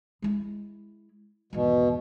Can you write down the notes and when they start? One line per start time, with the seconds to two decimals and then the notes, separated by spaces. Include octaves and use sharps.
0.22 G#3 E4
1.53 G#1 E2 B2